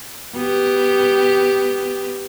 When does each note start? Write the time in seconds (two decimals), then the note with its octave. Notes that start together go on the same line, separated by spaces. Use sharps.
0.36 B3 G4